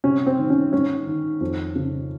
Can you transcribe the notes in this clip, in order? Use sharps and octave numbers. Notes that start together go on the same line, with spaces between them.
C3 C#4
C4
D#3
C#4
G#2 C#4
D#3
F2
C#3